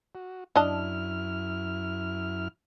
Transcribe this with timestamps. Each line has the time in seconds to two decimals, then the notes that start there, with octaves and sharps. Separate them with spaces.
0.15 F#4
0.56 F#2 D4 E4 D#5 A5 F6